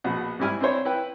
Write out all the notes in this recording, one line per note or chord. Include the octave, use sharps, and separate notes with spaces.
A#1 B2 F#5
G#2 G3 E4 G#5 F6
C4 D4 E4 C5 C#5
E4 B4 G5